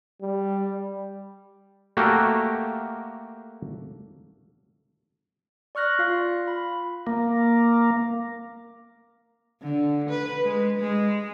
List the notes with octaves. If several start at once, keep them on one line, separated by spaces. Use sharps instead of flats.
G3
A3 A#3 F#4 G4
D5 C#6 F6 F#6 A#6
F4 F5
B5
A#3
D3
B4
G#3
G#3